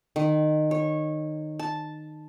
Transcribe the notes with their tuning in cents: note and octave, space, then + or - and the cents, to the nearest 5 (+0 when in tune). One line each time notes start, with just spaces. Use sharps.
D#3 -20
C#5 -20
A5 -5